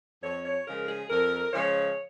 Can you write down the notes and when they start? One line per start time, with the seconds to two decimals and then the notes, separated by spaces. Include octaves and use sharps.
0.23 F2 C#5
0.45 C#5
0.67 C#3 F3 G#3 A#4
0.89 G#4
1.10 F2 A#4
1.53 C#3 F3 G#3 C#5